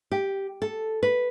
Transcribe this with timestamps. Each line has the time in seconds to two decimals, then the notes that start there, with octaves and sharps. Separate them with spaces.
0.12 G4
0.62 A4
1.03 B4